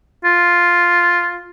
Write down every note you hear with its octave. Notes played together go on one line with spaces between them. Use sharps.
F4